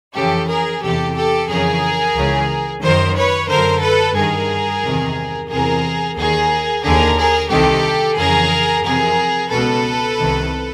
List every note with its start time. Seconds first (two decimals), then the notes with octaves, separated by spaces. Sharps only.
0.15 F2 C#3 E3 G4 A4
0.49 G#4 A#4
0.82 E2 C3 E3 G4 A4
1.16 G4 A4
1.49 F2 C#3 E3 G#4 A#4
2.15 C#2 C#3 E3
2.82 F#2 D#3 A#4 C5
3.16 B4 C#5
3.49 F#2 D3 A#4 C5
3.82 A4 B4
4.16 G2 D#3 G#4 A#4
4.82 E2 C3 D#3
5.49 E2 C3 E3 G#4 A#4
6.16 D#2 D#3 G#4 A#4
6.83 D#2 D3 G#4 A#4
7.17 G#4 A#4
7.50 C2 C3 D#3 G4 A4
8.16 F2 C#3 E3 G#4 A#4
8.83 F2 C3 E3 G#4 A#4
9.50 C#2 B2 A4 B4
10.16 C2 C3 D#3